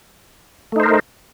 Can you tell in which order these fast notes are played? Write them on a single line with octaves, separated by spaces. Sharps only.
A3 D#4 C5 A#4